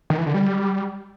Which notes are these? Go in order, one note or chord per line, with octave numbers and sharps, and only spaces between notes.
D#3
E3
D3
G3